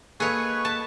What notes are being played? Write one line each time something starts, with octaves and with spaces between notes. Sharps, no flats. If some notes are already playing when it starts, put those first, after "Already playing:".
A#3 G#4 A4 B4 C#5 D#5 C#6
A5